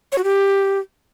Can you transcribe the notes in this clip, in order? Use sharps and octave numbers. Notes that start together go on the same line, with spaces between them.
C#5
F#4
G4